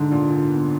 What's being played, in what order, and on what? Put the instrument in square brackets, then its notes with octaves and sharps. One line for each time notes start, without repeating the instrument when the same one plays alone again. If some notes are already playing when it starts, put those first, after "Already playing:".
Already playing: [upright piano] G#2 [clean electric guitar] D3
[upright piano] A#2
A#2
B3